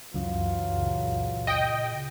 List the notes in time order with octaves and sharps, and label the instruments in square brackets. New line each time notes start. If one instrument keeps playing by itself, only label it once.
[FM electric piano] C#2 F#2 [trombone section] E3 F#3 F4
[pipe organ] A#2 C#3
[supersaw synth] D#5 G5